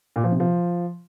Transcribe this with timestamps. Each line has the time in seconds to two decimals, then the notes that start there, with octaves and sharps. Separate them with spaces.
0.16 A#2
0.24 F3
0.32 C3
0.40 F3